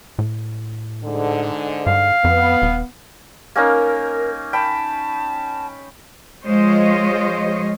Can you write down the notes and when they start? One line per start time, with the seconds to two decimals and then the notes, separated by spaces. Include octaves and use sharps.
0.19 A2
1.04 G#2 D3
1.87 G2 F5
2.24 F2 B3
2.62 D#1
3.56 A#3 C#4 D#4 A#4
4.53 G5 A5 B5
6.45 F3 G#3 F4 C5 C#5 D#5